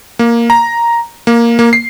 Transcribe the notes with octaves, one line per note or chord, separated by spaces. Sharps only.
A#3
A#5
A#3
A#3
C7